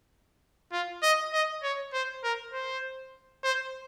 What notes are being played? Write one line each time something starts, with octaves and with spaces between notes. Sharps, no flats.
F4
D#5
D#5
C#5
C5
A#4
C5
C5